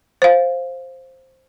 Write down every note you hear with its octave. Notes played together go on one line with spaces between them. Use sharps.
C5 F5